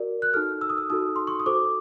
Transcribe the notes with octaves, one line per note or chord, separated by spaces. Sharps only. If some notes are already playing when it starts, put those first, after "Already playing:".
Already playing: F#4 A#4 D5
F#6
D#4 F#4 A4 F6
E6
D#6
E6
D#4 F#4 A4 D#6
C6
C#6
D#6
F#4 A4 C5 D6